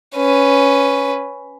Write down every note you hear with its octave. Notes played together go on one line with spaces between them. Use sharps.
C#4 B4